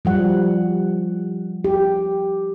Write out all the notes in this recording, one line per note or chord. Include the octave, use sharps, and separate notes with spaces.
F3 G3 F#5
G4